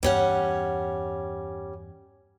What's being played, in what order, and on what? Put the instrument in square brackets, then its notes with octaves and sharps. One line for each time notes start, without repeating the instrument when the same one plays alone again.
[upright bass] E2 G2 [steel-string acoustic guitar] G3 C#4 F#5